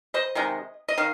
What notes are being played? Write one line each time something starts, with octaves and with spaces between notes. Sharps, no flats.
C5 D#5
C3 D#3 G#3
D#5
D#3 F5